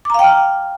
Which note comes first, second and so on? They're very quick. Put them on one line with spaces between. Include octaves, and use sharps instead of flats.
D6 A#5 F5 G5 F6